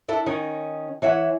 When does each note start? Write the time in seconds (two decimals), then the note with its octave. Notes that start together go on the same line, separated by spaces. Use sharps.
0.08 D4 E4 A4 A5
0.26 D#3 C#4 D#4
1.02 E3 C#5 E5 F#5